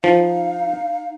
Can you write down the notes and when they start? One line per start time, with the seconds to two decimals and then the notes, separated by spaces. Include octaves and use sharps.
0.04 F3 D#4 F5